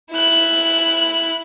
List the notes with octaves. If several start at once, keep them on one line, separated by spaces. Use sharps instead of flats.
E4 F#6